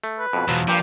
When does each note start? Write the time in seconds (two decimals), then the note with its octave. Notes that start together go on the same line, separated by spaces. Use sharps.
0.04 A3
0.19 B4
0.33 F2 B2
0.48 E2 B2 F3 F#3
0.68 G2 A#2 F3 G4